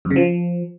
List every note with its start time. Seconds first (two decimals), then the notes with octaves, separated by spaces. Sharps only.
0.05 F#2
0.11 C#3
0.16 F3